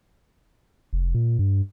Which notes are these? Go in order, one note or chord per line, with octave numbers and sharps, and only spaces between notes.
F1
A#2
G2